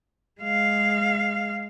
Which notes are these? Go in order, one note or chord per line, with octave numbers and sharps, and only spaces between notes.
G#3 F5